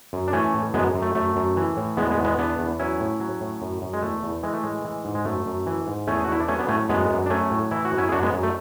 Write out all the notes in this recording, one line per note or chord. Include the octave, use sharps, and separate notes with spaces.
F#2
D4
E3 A3 C#4
A2
F#2 G#3 B3
F#2
A3
F#2 A3
F#2
E3
A2
E2 G#3 B3
G#3 B3
E2
G#3 B3
E2 B3 D4
E2
F#3 C#4 E4
A2
F#3
A2
F#2
F#2
G#3
E2 A3
E2
E3 G#3
A3
A2 G#3
E3
G#2
G#3
F#2 A3
F#2
E3
G#2
E2 A3 C#4
G#4
F#4
E2 E4
D4
F#3 A3 C#4
B3 D4
A2 A3 C#4
F#2 G#3 B3
F#2
D4
F#3 A3 C#4
A2
E3 E4
F#4
F#2
C#4 E4
G#4
F#2 D4 F#4
G#3 B3
F#2
A3